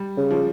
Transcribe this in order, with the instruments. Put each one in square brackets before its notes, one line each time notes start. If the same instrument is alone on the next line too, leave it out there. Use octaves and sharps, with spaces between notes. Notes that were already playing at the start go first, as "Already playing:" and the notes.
Already playing: [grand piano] G3
[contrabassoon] C#3
[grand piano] F3